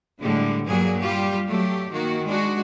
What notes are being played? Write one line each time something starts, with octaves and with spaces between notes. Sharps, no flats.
A2 D3 G3 G#3
G2 A#2 F#3 G3 A#3 G#4
G3 F4 G4
F#3 A3 G4
D#3 A#3 F#4
G#3 D4 F#4